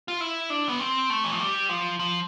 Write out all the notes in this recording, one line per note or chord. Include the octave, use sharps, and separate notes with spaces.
F4
E4
D4
B3
C4
A3
E3
F3
G3
F3
F3